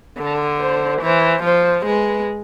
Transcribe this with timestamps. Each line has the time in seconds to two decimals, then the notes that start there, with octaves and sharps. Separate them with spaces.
0.18 D3
0.59 C5
1.02 E3 C5
1.43 F3 C5
1.86 G#3 B4